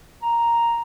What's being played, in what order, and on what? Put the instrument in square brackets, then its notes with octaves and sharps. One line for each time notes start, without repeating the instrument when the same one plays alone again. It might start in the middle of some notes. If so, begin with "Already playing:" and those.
[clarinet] A#5